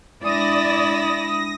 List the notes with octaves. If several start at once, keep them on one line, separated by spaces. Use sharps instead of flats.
G#3 D4 E4 D5 D#6 A#6